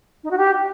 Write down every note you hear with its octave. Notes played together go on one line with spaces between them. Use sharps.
D#4
F#4
G4